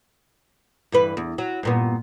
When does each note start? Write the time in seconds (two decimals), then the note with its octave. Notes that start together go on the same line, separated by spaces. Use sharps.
0.92 G2 E3 B4
1.17 E2
1.38 F#3
1.63 G2 A#2 B3